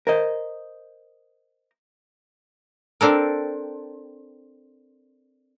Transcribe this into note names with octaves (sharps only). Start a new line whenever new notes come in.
A#4 C5 D#5
C4 D4 A4 A#4